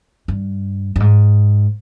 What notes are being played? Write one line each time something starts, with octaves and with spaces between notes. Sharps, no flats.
G2
G2
G#2